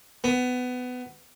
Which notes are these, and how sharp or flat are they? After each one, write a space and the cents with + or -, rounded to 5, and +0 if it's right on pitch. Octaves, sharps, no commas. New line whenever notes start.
B3 +20